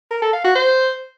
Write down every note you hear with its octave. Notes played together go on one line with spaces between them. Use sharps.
A#4
A4
F5
F#4
C5